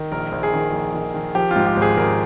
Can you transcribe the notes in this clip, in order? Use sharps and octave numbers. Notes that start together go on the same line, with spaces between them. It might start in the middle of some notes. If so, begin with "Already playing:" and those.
Already playing: D#3
A#1 A#4
A#1
G#4
D#3
A#1
D#3
D#3
F3 G4
F4
G#2
G4
G#1
G#4
G#1 A#4